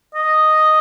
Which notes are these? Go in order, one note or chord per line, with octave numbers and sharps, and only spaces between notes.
D#5